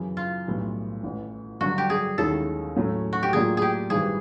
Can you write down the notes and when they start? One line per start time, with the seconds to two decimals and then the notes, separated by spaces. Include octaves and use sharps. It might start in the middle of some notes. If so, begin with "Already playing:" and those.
Already playing: F#2 C#3 E3
0.17 F4
0.47 B1 A2 E3 G3
1.03 A1 A2 E3
1.61 G2 D3 F#3 F#4
1.78 G4
1.90 G#4
2.18 D#2 D#3 G#3 C#4 E4 A4
2.76 A2 F#3 A3 C#4
3.13 F#4
3.23 G4
3.33 A2 F#3 A#3 D4 F4 G#4
3.57 G4 G#4
3.90 G#1 G2 E3 G3 G#4